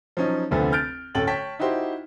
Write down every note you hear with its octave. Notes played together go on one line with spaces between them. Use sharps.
F3 F#3 C#4 D#4
F1 D2 F3 B3 A4
F6 G6 A6 D7
D1 C#4 A4 G5 A6 F#7
C#5 G5 A5 B6
D#4 E4 F#4 G4 C5